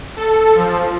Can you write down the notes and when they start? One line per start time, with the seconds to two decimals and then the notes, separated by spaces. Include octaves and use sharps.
0.17 A4
0.55 F3